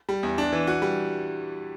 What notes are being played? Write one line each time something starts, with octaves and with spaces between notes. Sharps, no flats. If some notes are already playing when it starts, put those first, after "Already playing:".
G3
E2
D4
E3
F#4
G3